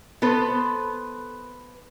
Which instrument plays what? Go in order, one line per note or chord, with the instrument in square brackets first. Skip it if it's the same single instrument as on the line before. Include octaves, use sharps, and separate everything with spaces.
[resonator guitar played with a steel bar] B3 A4 B4 C5